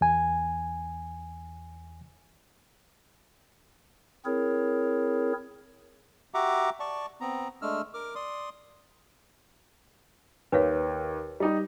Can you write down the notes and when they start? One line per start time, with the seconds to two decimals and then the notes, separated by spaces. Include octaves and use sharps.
0.01 E2 G#5
4.25 C4 E4 G#4 A#4 C#5
6.34 F#4 G4 E5 F#5 A#5 D6
6.80 D5 A5 C#6
7.21 B3 C4 A#5
7.62 G#3 A3 D4 E6 F6
7.94 A#4 D6 F6
8.15 D5 C6 D#6
10.52 D#2 B4 C#5 F5
11.40 G3 D#4 G4